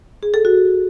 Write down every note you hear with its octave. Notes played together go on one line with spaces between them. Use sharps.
G#4
A4
F#4